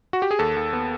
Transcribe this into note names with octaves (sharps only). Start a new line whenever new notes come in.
F#4
G4
G#4
D#2 A4
D#2
B3